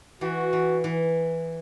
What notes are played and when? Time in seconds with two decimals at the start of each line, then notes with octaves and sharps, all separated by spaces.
0.21 E3 F#4
0.53 E3
0.84 E3